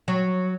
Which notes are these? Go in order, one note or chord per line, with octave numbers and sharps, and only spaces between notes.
F#3